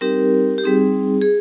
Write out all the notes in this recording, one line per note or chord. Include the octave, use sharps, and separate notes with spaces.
G3 C4 D#4 G4 A#4
G4
G3 C4 D#4 G#4
G#4